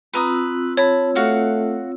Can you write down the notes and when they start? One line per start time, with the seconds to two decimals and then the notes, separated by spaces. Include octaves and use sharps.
0.14 C4 F4 B4 A#5 D#6 E6
0.77 C#5 A5 B5
1.15 A3 F#4 F5 F#5